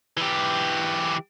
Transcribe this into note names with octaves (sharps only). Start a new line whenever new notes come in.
E3 G4